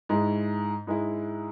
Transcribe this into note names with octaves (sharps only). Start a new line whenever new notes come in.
G#2 G#3 E4
G#2 G#3 E4